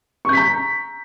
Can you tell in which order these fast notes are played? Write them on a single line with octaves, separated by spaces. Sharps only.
C#6 G6 B6 A#5